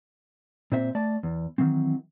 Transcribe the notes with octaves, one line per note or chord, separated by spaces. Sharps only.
A#2 C4 C5 E5
A3 D5 A5
E2
D#3 E3 F#3 C4